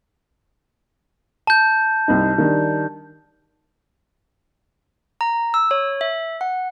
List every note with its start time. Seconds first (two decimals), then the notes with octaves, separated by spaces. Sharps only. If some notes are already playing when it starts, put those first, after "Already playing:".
1.47 A5 G6
2.08 C2 C4 D#4
2.38 D#3 G3 D4
5.21 A#5
5.54 E6
5.71 C#5
6.01 E5
6.41 F#5